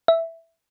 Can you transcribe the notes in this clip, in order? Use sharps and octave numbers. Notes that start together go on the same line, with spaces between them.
E5